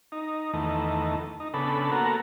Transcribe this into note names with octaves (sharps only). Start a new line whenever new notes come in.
D#4
E2 D#3 A3
D#4
C#3 B3 D4 A4 B5
A#3 B3 F#4 A4 A#4